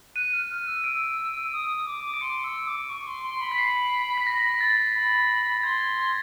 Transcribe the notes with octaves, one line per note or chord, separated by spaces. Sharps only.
F#6 D#7
F6
F6
E6
E6 D7
D#6
D6
D7
C6 C#7
E6
D6
C#6
C6
C6
B5
B6
C7
B6
A#6
A6
B5
C6 G#6